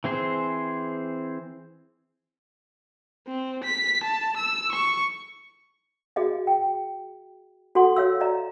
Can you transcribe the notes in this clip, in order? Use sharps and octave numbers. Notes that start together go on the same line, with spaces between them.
E3 C4 G#4 C5
C4
B6
A5
E6
C#6
F#4 G#4 D#5 F5
G5
F#4 A4 F#5 C6
F#4 C#5 F5 E6
D5 D#5 F5 A#5